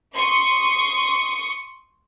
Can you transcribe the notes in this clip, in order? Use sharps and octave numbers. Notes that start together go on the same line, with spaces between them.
C6 C#6 D#6